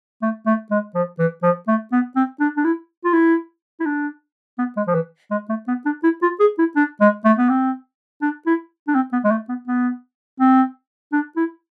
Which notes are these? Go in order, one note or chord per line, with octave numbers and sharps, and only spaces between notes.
A3
A3
G#3
F3
E3
F3
A3
B3
C4
D4
D4
E4
F4
E4
E4
D4
B3
G#3
F3
E3
G#3
A3
B3
D4
E4
F4
G#4
E4
D4
G#3
A3
B3
C4
D4
E4
D4
C4
B3
G#3
A3
B3
B3
C4
D4
E4